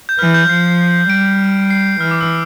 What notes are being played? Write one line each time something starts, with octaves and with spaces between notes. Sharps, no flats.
G6
E3 F6
G6
F3 C7
G3 D7
C7
E3 F6
D6
E6